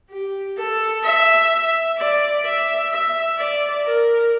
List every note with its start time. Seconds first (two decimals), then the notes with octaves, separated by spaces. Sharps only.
0.10 G4
0.58 A4
1.03 E5
1.98 D5
2.45 E5
2.91 E5
3.38 D5
3.85 A#4